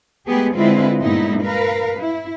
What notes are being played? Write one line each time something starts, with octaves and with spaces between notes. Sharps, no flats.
G#3 A3 B3 G4 G#4
D3 G#3 C4 E4 F4 B4
G2 A#2 G#3 B3 D#4 E4
A#4 B4 F5
E4